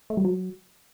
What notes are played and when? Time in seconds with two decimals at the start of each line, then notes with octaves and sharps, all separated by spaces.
0.10 A3
0.17 G3
0.24 F#3